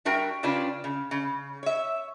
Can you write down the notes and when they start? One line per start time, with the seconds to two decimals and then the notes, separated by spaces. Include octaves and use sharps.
0.05 G3 D4 F#4 A#4 E5 G5
0.43 C#3 C#4 D4 F4 G4 B4
0.84 C#3
1.11 C#3
1.63 C#5 E5